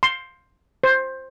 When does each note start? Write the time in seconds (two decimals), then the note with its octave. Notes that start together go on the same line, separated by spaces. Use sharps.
0.03 C6
0.84 C5